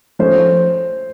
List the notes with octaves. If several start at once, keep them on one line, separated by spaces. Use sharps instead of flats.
F3 A3 C#4 F4 C5